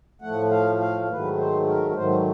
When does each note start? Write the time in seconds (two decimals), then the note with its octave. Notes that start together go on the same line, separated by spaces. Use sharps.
0.22 A2 F3 A3 F#5
0.51 F5
0.80 F5
1.08 G#2 D#3 F#3 A3 B4
1.38 C5
1.67 A#4
1.95 G#2 D#3 F#3 A3 C5